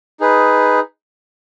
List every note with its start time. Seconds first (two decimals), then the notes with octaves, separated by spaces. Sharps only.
0.20 D#4 G#4 B4